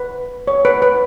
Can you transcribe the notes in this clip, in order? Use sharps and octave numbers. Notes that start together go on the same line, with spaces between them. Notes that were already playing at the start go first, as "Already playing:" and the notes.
Already playing: B4
C#5
B4
B4